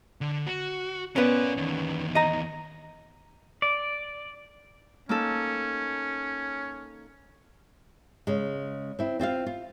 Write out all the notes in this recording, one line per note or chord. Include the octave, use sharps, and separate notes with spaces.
D3
F#4
B3 C#4 A#4 D5
E2 D#3
D#5 A#5
D5
A#3 C#4 D#4 A4
C#3 G#3
C4 E4
C4 F4 E5 F5
F4